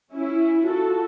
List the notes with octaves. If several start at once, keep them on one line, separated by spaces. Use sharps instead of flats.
C#4 E4
F4 F#4 A4